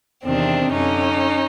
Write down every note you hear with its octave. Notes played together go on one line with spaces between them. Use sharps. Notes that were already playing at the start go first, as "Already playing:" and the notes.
E2 C3 D#3 C4 D4
F#2 D3 C#4 D#4